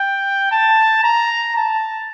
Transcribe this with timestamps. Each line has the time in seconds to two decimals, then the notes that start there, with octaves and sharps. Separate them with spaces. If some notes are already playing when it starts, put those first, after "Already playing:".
Already playing: G5
0.52 A5
1.04 A#5
1.56 A5